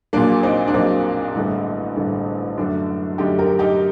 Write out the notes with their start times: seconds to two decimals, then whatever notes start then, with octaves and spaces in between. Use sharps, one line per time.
0.13 A#1 A#2 F#3 A#3 D4
0.43 C4 D#4
0.67 D4
0.74 A#1 A#2 F#3 A#3 C4 D#4
1.35 A1 G2 D3 A3
1.96 A1 G2 D3 A3
2.57 F#2 D3 A3 D4 F#4
3.18 F#2 D3 A3 D#4 G4
3.39 G4 A#4
3.59 D#4 G4